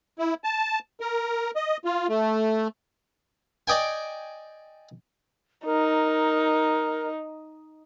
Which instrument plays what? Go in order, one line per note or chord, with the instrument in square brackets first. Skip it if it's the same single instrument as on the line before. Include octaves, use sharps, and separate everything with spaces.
[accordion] E4
A5
A#4
D#5
F4
A3
[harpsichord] D5 D#5 G5 G#5
[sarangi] D#4 [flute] A#4